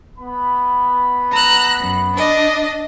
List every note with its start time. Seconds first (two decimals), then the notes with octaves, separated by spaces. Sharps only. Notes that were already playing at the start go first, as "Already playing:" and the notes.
0.18 B3 B5
1.31 A#5 E6 F#6
1.79 F#2
2.16 D4 D5 D#5